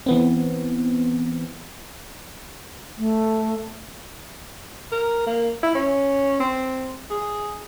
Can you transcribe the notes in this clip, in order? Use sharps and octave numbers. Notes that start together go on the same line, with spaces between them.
E3 B3 C4
A3
A#4
A#3
E4
C#4
C4
G#4